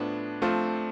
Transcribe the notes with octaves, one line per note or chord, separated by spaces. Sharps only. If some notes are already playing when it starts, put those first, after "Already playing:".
Already playing: A2 F3 B3 D4
F3 A3 C4 F4